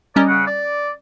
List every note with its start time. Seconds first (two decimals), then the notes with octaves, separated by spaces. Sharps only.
0.16 G3 C#4 D#4 A#4 D5 D#5
0.28 C#3 F#5
0.48 D5